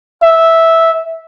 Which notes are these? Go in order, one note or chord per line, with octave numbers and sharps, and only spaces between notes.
E5